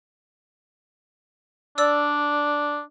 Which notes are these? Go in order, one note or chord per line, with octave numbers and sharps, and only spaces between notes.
D4 D5 E6